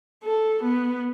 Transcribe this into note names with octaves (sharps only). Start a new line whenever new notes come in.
A4
B3